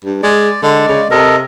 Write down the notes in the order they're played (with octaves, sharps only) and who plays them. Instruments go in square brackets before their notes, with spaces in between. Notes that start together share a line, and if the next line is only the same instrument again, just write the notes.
[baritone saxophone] G2
[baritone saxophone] G#3 [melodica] D5
[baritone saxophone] D3 [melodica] G#3 D5
[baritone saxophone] C#3
[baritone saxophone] C3 [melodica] A4 A#4 D#5